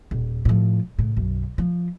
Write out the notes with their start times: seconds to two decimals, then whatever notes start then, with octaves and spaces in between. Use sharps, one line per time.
0.11 D#1
0.45 A2 F3
0.99 A2 C#3
1.17 B1 F#2
1.58 F3